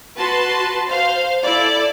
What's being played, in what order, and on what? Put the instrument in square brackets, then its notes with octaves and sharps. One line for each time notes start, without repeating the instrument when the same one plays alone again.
[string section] F#4 B4 A5 C6
C5 F5
E4 A4 D5